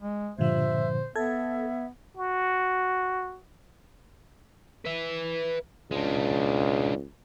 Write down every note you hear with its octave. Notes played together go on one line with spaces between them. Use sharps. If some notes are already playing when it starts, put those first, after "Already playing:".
G#3
G2 A#2 D3 F3 C5 E5
B3 A4 E5 G#6
F#4
B4 E5
C#2 G#3 D4